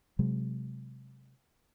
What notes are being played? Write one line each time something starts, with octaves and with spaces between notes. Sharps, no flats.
C3 F#3 G#3